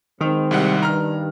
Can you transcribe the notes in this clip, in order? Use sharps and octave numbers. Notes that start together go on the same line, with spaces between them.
D#3 G#3 C4
C2 G3 F#5
G2 A#5 F6